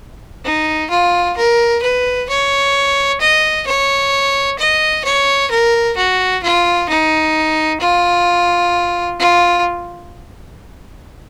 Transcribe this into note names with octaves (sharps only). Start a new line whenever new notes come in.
D#4
F4
A#4
B4
C#5
D#5
C#5
D#5
C#5
A#4
F#4
F4
D#4
F4
F4